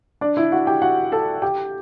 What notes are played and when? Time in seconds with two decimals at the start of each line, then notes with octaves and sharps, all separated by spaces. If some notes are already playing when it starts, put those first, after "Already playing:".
0.21 D4 D5
0.37 E4 E5
0.52 F#4 F#5
0.67 G4 G5
0.82 F#4 F#5
1.12 A4 A5
1.42 G4 G5